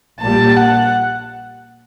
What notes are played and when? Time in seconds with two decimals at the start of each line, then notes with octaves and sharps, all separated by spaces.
0.20 A#1 A#2 G3 A5
0.57 F#5